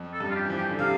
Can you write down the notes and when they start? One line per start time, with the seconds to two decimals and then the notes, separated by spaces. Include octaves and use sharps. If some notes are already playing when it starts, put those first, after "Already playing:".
Already playing: F2
0.13 A4
0.20 G2
0.30 F4
0.35 G4
0.45 E3
0.50 F3
0.57 G4
0.69 D3
0.79 C3 F5